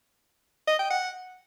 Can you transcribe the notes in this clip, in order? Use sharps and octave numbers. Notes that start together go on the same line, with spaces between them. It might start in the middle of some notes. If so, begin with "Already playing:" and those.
D#5
G5
F#5